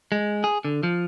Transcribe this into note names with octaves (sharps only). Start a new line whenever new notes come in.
G#3
G#4
D3
F3